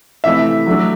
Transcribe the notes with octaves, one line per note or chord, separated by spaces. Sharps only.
C3 E3 A3 E4 E5
F#3 A3 D4